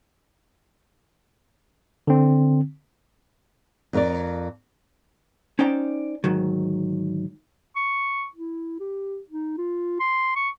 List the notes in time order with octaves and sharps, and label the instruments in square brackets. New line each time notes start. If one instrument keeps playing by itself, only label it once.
[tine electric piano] D3 C4
[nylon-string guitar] F2 A#4 D5
[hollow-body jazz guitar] C#4 D#4 C5 D5 G5 A#5
D2 G#2 D#3 F#3
[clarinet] C#6
E4
G4
D#4
F4
C6
C#6